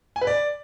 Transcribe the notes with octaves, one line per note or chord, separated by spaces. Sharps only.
G#5
B4
D5